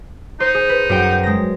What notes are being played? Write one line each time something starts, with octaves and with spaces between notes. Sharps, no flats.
D#4 C5
G#4
B4
F#2 G5
G#3 A#6